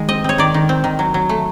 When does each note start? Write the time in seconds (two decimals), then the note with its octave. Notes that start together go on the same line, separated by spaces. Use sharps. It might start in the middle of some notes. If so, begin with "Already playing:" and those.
Already playing: D#3 G#3
0.09 C4 D#5
0.24 C4 C#5
0.38 D#3 D5
0.54 D#3
0.69 C4
0.84 D#3
0.99 F#3
1.14 F#3
1.29 A3